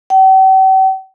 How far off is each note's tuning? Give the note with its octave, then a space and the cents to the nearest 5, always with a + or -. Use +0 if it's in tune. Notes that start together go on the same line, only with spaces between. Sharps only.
G5 -45